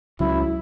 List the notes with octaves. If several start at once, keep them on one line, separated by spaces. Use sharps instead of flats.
C#2 C#3 F#3 E4